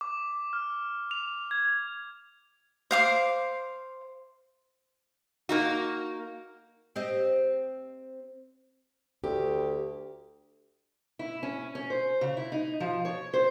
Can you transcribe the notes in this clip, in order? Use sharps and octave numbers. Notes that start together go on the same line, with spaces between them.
D6
F6
F7
G#6
C5 F5 D6
A#3 D#4 F#4
C4 G4 D#5
D2 G4
E4
C#4
C#4
C5
C#3
E4
D#4
F3
C#5
C5